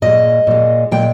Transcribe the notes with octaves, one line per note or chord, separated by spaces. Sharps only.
A#2 G#3 D#5
A#2 G#3
A#2 G#3 G5